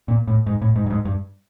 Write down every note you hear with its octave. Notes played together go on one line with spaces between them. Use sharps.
A#2
A2
G#2
A2
G#2
G2
G#2
G2